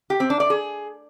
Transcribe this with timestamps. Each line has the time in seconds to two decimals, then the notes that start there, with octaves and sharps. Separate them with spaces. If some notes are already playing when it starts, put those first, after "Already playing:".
0.10 G4
0.20 C4
0.30 D4
0.40 D5
0.50 G#4